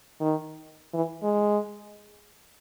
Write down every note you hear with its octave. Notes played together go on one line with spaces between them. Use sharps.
D#3
E3
G#3